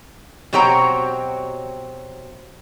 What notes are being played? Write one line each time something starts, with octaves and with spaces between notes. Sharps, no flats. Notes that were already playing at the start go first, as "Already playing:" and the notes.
B2 F#3 C4 G4 C#5 A#5